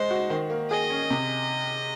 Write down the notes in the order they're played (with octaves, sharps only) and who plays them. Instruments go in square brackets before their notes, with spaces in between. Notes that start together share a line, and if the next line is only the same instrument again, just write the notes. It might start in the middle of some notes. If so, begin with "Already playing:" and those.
Already playing: [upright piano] G#3 D#4 [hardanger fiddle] C5
[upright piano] F#4
D#3
A#3
[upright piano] G#4 [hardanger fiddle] D#5
[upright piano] C#4
C3